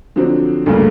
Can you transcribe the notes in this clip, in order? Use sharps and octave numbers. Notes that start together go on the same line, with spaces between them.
D3 F3 F#3 C4 D4
D2 G2 C#3 A3 A#3